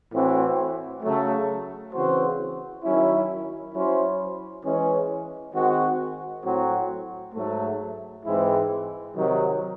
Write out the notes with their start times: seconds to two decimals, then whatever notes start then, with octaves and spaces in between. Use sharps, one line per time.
0.13 A2 E3 C4 F#4
1.03 C#3 F#3 A3
1.93 C#3 E3 C4 F#4 C5
2.84 D#3 F#3 C#4 E4
3.74 F#3 C#4 E4 C5
4.64 E3 G#3 C#4
5.54 D#3 G#3 C4 F#4
6.45 A2 F#3 C4 F#4
7.35 G#2 F#3 A3
8.26 G#2 E3 G#3 C4 E4
9.16 C3 D#3 F#3